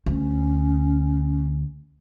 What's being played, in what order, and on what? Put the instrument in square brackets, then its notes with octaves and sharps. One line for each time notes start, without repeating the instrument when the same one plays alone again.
[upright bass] D2 [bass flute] C#4